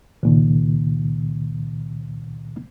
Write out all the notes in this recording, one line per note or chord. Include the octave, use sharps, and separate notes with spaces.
C#2 A#2 D#3